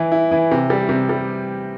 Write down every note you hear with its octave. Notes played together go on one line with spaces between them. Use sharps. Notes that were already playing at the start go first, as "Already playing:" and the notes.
Already playing: E3 E4
E4
E3
C3
G3
C3
G3